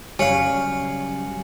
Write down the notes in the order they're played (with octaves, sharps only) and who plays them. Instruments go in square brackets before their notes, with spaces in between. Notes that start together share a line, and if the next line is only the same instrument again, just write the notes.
[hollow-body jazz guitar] C#3 F#3 G3 [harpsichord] C#5 F5 [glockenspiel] G#5 C#7 F#7